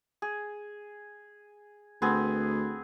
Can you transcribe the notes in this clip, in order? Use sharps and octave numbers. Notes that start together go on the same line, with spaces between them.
G#4
D2 B3 C4 G#4